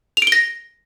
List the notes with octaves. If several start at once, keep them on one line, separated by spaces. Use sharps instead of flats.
F7
D7
G7
A#6